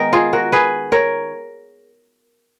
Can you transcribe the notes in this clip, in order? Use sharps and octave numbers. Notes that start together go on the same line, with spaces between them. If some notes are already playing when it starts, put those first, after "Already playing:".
Already playing: D#3 G#3 B3 D#4 A#4
F4 G#4
F#4 A#4
G#4 B4
A#4 C#5